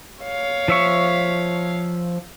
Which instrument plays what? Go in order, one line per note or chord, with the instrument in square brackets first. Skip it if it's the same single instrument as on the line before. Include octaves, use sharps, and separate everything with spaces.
[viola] C#5 F5
[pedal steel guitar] F3 E5 C#6